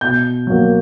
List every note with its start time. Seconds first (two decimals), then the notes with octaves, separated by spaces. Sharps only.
0.01 B2 G6
0.47 F#3 A#3